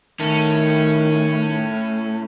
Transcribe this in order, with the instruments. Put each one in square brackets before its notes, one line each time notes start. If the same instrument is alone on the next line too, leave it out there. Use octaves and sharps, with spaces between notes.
[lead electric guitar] A2 [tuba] D#3 [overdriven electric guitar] C#4